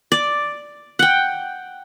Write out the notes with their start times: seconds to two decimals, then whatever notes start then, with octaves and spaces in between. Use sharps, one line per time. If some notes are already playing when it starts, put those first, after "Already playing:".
0.12 D5
0.99 F#5 G5